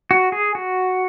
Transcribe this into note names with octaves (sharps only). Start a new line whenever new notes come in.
F#4
G#4
F#4